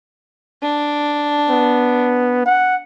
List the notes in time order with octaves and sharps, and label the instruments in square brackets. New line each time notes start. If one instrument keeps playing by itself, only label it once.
[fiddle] D4
[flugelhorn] B3
F#5